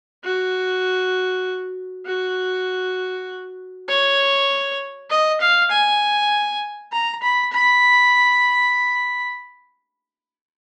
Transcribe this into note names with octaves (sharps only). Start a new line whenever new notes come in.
F#4
F#4
C#5
D#5
F5
G#5
A#5
B5
B5